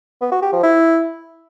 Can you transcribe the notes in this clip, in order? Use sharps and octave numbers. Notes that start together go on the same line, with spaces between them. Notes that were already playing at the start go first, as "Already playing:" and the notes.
B3
F#4
G4
F3
E4